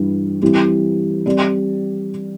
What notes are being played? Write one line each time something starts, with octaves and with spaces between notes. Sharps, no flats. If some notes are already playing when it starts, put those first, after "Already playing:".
Already playing: G2 E3 G3
E3 G3 C4 G4
G3 C4 G4 D5